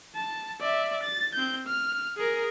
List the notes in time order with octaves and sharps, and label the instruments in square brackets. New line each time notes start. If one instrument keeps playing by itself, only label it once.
[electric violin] A5
D5 E5
A6
C4 G6
F6
G#4 A#4